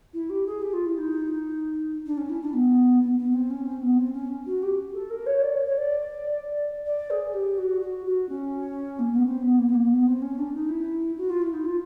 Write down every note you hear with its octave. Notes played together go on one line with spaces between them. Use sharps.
E4
G4
G#4
G4
F4
E4
D#4
D4
C#4
E4
D4
B3
B3
B3
C4
C#4
C4
B3
C4
C#4
F#4
G4
A4
A#4
C#5
D5
C#5
C#5
D5
D5
G#4
G4
F#4
F#4
F#4
C#4
A#3
B3
C4
B3
A#3
B3
A#3
B3
C4
C#4
D4
D#4
E4
F#4
F4
E4
D#4
F4